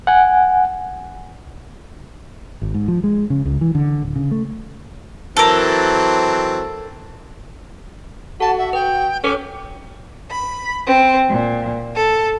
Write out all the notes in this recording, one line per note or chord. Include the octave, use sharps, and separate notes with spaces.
F#5 G#5
G#1
G#2
F3
G#3
C#3
C#2
E3
D3
D1
C#3
A3
E3 F#3 C4 A4 A#4
F#4 A4 F#5 A5
E5
B4 G5
C#4 A4 B4 C#5 D6
B5
C4
A#2
A4